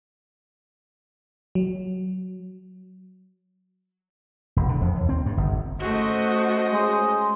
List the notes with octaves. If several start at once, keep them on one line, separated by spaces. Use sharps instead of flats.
F#3
E1
D3
F2
D#2
C4
G2
G1
A3 C#4 F#4 C5 D#5
G#3